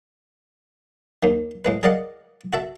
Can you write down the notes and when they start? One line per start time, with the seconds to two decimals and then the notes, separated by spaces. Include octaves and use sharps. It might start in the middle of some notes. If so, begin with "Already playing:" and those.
1.23 D#2 D#3
1.65 A2 G#3 B4
1.83 G#4 A#4 D5 D#5 F5 F#5
2.53 F#4 A4 E5